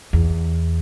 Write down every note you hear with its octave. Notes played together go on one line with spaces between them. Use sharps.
E2